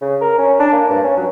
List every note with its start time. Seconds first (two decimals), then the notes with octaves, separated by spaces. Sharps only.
0.01 C#3
0.21 A#4
0.38 C#4
0.60 D4
0.73 A#3
0.90 G2
1.03 C#4
1.17 F#3